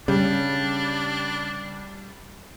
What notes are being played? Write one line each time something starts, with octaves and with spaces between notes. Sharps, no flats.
C#3 G3 D4